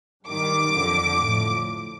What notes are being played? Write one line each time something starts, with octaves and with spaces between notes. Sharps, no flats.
G2 D#3 G3 D6
F2 D3 F3
A2 F3